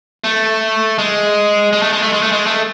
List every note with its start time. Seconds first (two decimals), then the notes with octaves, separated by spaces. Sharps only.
0.24 A3
0.98 G#3
1.73 G#3
1.82 A3
1.92 G#3
2.02 A3
2.13 G#3
2.22 A3
2.32 G#3
2.47 A3